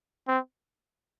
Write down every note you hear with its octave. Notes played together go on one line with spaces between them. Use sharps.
C4